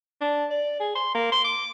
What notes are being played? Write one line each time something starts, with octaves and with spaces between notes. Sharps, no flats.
D4
D5
G#4
C6
A#3
C6
D6